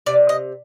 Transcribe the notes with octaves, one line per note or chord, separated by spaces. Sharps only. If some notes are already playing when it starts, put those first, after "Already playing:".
C3 D5
D#5